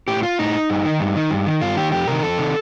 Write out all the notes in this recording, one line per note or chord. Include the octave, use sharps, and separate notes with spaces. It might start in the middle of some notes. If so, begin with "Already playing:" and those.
A2 G4
F4
A2 D#4
G2
D#3
G2
D#3
G2
D#3
G2 F4
D#3 G4
F2 G4
C3 D#3 A#4
F2 A4
C3 D#3